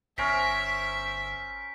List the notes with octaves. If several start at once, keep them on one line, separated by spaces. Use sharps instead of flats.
G1 C#4 A#4 C5 E5 B6